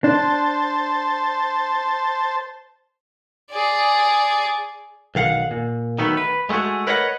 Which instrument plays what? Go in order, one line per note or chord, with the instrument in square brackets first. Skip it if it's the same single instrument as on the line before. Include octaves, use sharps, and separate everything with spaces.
[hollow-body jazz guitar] D4 [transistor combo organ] C5 A5
[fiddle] G#4 D5
[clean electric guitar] B1 D#3 F5 F#5
A#2
D#3 F#3 A3 B3
B4
G#3 A3 D#4 F#4 G#4
A#4 B4 C#5 D#5 F5 F#5